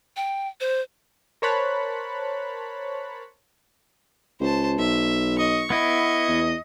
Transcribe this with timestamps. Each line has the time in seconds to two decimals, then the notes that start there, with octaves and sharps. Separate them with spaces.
0.17 G5
0.61 C5
1.42 A#4 C5 C#5 A5 B5 F#6
4.40 C#2 C5 A5
4.79 B1 E5
5.39 D#5 C#6
5.70 B3 E4 D#5
6.28 E2